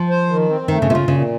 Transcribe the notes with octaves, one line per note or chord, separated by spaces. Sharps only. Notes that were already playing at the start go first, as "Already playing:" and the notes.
Already playing: F3
C5
D#3
C4
D#3 A3
C#3
C3 F4
C#3
A#2 C#3